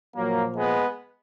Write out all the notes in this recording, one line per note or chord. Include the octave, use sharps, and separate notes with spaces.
A#2 F3 F#3 A#3
G#3 B3